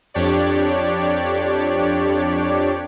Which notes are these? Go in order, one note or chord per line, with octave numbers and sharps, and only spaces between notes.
F2 D4 G4 C#5 D5